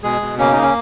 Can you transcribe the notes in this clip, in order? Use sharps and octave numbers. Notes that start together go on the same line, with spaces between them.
B2 G#3 G#4
B2
C#3 A#3 C#4
A#3 D#4
C#4